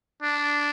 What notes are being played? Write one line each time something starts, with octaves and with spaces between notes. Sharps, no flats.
D4